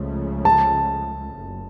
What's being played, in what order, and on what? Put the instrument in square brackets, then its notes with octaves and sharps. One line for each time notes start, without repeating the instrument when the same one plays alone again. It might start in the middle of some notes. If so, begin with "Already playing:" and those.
Already playing: [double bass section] C#2 C#3 F3 A3
[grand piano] A5
[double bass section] F#1